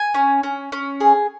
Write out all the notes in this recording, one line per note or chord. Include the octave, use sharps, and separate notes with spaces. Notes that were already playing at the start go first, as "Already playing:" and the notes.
Already playing: G#5
C#4
C#4
C#4
G#4